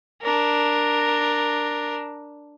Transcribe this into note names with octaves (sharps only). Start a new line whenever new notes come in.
D4 A#4